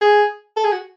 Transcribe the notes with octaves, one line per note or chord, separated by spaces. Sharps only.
G#4
A4
G#4
F#4